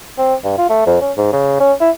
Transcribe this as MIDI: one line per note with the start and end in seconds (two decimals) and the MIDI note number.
0.18 0.35 60
0.44 0.54 43
0.58 0.66 65
0.70 0.85 57
0.86 0.98 41
1.01 1.12 61
1.17 1.30 44
1.32 1.58 49
1.60 1.73 61
1.81 1.91 64